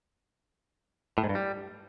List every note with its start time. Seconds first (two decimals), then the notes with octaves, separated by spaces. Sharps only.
1.18 A2
1.24 G#2
1.29 G2
1.35 G3